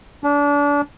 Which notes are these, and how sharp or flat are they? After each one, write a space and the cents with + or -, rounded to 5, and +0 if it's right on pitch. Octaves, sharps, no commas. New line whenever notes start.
D4 -30